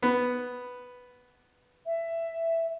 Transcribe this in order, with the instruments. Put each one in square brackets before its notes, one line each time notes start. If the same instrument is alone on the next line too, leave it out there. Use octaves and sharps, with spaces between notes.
[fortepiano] B3
[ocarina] E5